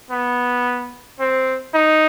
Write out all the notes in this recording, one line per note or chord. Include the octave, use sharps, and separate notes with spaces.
B3
C4
D#4